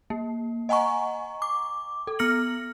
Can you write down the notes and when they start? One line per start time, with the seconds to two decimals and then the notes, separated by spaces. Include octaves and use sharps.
0.10 A#3
0.69 D#5 F#5 G#5 A#5 C#6
1.42 D6
2.07 A4
2.19 B3 F6 A#6 C#7 F#7